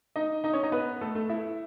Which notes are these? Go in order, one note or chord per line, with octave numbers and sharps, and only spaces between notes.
D#4 D#5
D#4 D#5
C#4 C#5
D#4 D#5
B3 B4
A3 A4
A3 A4
E4 E5